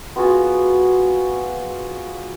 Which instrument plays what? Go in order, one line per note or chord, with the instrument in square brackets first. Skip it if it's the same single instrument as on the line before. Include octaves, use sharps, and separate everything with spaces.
[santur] B3 F4 F#4 G#4